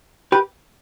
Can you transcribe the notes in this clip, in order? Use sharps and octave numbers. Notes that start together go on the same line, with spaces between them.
G4 B4